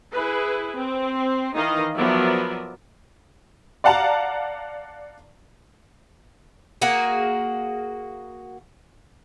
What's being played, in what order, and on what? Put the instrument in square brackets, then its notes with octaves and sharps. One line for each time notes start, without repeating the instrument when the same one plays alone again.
[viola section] E4 G#4 B4
C4
D#3 E3 D#4 D#5 F5
F3 F#3 B3 A#4 D5 E5
[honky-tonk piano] D5 F5 F#5 A5 A#5
[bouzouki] A#3 F#4 G#4